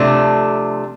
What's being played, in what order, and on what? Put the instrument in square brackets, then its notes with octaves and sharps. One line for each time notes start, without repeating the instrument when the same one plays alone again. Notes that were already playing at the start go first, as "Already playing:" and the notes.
Already playing: [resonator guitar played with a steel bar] C3 F3 A3 D4